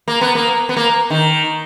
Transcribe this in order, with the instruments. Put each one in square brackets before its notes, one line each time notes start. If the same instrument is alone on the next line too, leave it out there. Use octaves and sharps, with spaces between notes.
[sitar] A#3
B3
A#3
B3
A#3
D#3